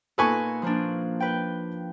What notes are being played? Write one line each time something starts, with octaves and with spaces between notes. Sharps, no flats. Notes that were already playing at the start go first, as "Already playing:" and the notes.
A#2 D#4 A4 B4 G#5 C#6
F3 A#3 D4
B4 G5